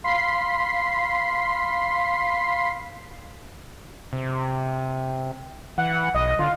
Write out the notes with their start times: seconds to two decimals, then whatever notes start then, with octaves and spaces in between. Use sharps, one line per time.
0.04 F5 B5 C6 B6 C7
4.13 C3
5.78 E3 F#5
6.15 B1 D#5
6.39 D3 F4